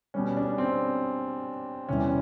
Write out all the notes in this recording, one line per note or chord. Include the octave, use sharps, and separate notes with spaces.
B2 G3 C#4
D4
C4
E2 C3 E3 G3 C#4